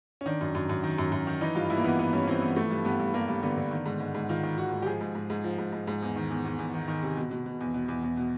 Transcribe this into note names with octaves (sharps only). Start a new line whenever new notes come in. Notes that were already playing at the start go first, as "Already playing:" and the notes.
C#4
D#3 D4
F#2
F#2
F#2
D#3
F#2
F#2
D#3
E3 D#4
G2 F4
G2 E4
A#3
E3 B3
E3 B3
G2 C#4
E3 C4
E3 B3
F3 A3
G2
G2 B3
G2
G2 A#3
G2
D3 B3
D3
D#3
G#2
G#2
G#2
D#3 F4
D#3
D#3 F#4
G#2
G4
F3 G#4
G#2
G#2
G#2
F3
G#2
G#2
G#2
E2
D#3
E2
E2
E2
D#3
D#3
C3
B2
B2
B2
E2
B2
E2
E2
B2